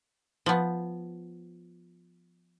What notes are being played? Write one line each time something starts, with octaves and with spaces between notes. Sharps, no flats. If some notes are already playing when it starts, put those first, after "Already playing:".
F3 B3